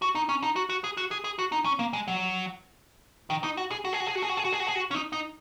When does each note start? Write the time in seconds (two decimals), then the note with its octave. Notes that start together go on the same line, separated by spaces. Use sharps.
0.02 F#4
0.15 D#4
0.29 C#4
0.43 D#4
0.56 F#4
0.70 F#4
0.84 G#4
0.97 F#4
1.11 G#4
1.24 G#4
1.39 F#4
1.52 D#4
1.65 C#4
1.79 A#3
1.93 G#3
2.08 F#3
3.30 D#3
3.44 D#4
3.57 F#4
3.71 G#4
3.85 F#4
3.93 G#4
4.00 F#4
4.07 G#4
4.15 F#4
4.22 G#4
4.29 F#4
4.37 G#4
4.45 F#4
4.52 G#4
4.60 F#4
4.67 G#4
4.75 F#4
4.91 C#4
4.94 D#4
5.13 D#4